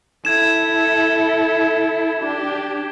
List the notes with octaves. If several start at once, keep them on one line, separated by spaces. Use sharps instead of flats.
E4 A4 G#6 E7
D4 G4